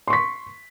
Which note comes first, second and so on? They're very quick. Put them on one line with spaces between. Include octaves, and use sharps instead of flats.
C6 C#6 B6